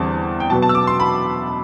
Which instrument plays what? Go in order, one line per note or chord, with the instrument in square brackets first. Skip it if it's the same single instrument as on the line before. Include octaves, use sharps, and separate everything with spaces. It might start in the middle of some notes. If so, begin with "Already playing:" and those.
Already playing: [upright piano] E2 D3 G3 C4 A5
G5
B2 F#3 B3 A5
A5
E6
D6
C6
B5